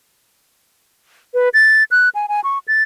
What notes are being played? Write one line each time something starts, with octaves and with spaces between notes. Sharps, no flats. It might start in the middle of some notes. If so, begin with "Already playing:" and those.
B4
A6
F#6
G#5
G#5
C#6
A6